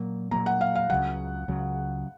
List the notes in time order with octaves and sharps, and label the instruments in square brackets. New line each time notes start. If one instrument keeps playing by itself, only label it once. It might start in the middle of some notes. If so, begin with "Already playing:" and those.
Already playing: [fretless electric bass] A#2 F#3 A#3
[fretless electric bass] A#2 F#3 A#3 [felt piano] A#5
[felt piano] F#5
F5
F5
[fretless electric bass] C#2 C#3 F#3 [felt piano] F#5
[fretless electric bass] C#2 C#3 F#3